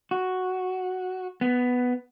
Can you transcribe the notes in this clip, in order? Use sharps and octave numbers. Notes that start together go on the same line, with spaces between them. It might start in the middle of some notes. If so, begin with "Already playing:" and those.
F#4
B3